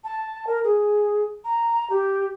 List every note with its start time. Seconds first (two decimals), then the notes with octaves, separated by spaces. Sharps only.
0.04 A5
0.47 A#4
0.64 G#4
1.45 A#5
1.90 G4